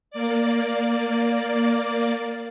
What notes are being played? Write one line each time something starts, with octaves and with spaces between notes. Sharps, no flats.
A#3 D5